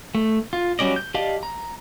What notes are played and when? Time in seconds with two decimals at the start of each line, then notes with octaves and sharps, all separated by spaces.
0.15 A3
0.53 F4
0.79 F#3 G3 C#4 D5 D#5
0.96 G6
1.14 G4 D5 D#5 F5 A5
1.43 A#5